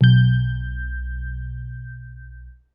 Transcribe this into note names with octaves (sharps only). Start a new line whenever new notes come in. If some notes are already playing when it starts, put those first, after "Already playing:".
B1 G6